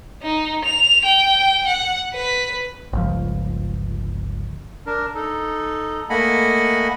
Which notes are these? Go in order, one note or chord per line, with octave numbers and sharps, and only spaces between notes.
D#4
F7
G5
F#5
B4
G1 C#2 F3
D4 A#4
D#4 A4
A3 A#3 D#5 F#5 G#5 B5